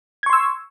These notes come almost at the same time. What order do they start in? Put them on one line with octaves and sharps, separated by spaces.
G#6 C#6 C6 E6